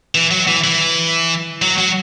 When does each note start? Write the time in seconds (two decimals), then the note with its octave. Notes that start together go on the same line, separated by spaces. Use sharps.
0.15 E3
0.31 F#3
0.47 E3
0.64 E3
1.62 F#3
1.78 F#3